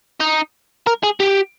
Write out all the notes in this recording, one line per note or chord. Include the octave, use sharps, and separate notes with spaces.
D#4
A#4
G#4
G4